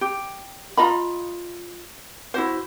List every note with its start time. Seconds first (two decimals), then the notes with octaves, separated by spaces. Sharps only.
0.01 G4
0.77 F4 D#5 A#5 B5
2.34 E4 F#4 C5